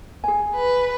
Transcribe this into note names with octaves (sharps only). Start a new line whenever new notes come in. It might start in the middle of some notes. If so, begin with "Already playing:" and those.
G#4 G#5
B4